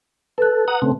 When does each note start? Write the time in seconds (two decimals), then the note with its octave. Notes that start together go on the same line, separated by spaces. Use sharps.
0.38 A4 B4 F#6
0.68 F#5 A#5 D#6
0.82 C#3 A3 C4